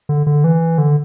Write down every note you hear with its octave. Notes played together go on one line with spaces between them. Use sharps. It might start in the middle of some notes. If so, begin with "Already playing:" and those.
D3
D3
E3
D3